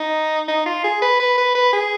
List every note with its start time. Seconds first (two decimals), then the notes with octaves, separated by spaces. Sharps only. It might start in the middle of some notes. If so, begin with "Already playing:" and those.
Already playing: D#4
0.48 D#4
0.66 F4
0.84 G#4
1.02 B4
1.20 B4
1.38 B4
1.55 B4
1.73 G#4